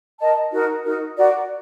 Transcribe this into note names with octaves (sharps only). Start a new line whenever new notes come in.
A#4 D#5 A5
D#4 F#4 A#4
D#4 F#4 A#4
F#4 A#4 D5